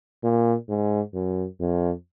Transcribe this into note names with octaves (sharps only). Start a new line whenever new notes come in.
A#2
G#2
F#2
F2